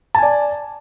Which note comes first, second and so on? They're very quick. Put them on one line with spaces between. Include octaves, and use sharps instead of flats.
A5 G#5 D5